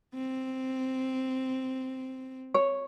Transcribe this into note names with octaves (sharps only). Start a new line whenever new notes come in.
C4
C#5